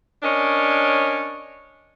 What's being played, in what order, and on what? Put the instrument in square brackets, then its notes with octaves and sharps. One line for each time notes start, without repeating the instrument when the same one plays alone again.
[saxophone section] C#4 D4 A#4 C#5 D#5